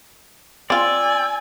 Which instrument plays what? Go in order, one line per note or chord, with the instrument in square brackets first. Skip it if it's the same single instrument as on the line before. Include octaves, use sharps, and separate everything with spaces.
[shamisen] C4 F4 [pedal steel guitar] D5 [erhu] G#5 [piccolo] E6